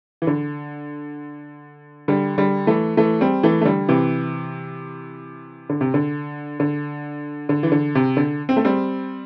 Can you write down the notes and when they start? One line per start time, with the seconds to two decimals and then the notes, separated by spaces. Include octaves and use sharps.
0.22 E3
0.27 D3
2.08 D3 G3
2.38 D3 G3
2.67 E3 A3
2.97 E3 A3
3.21 G3 C4
3.43 E3 A3
3.61 A3
3.65 D3 G3
3.89 C3 E3
5.70 D3
5.81 C3
5.94 D3
6.60 D3
7.49 D3
7.63 E3
7.72 D3
7.95 C3
8.17 D3
8.49 C4
8.57 A3
8.65 G3 C4